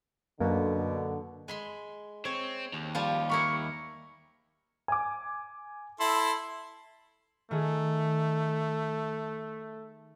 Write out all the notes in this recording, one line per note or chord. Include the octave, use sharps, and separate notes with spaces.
F#2 B2 D3 A#3
G#3 B5 C6
C4 C#5
D#2
F3 G3 F4
E4 A#4 B5 C#6
G#5 D6
E4 A4 C6
D#3 A3 G#4